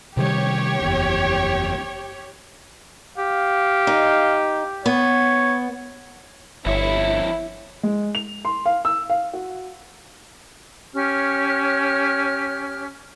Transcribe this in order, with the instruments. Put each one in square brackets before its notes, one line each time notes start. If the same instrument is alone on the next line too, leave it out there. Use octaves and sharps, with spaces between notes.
[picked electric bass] C3 D#3 G3 [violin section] G4 C#5
[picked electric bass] F#1 E2
[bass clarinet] G4 [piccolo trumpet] F5
[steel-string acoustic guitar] D#4
[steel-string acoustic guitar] B3 [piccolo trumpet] C#5
[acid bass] G1 [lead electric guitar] F2 C#5 [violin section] E4
[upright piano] G#3
F7
C6
F5
E6
F5
F#4
[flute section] C#4 G4 C#5 F6